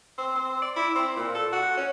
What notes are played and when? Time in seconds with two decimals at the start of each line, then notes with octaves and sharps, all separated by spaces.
0.18 C4
0.35 C4
0.62 D5
0.76 E4
0.96 C4
1.16 A#2
1.35 A4
1.52 F#4
1.78 C#4